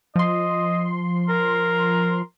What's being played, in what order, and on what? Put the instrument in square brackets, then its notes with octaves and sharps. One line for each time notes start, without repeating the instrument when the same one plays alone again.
[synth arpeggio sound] F3 C6 [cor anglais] D#5
[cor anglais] A#4